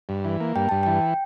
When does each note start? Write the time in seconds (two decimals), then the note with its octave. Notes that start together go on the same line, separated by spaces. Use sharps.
0.09 G2
0.25 E3
0.41 A#3
0.56 G2 G5
0.69 G2 A5
0.83 E3 G5